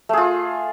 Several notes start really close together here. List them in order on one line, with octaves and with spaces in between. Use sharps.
A3 G#4 F4